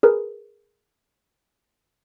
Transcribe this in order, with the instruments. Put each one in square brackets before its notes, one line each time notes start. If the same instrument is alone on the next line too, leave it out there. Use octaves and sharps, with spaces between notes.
[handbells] G#4 A#4 B4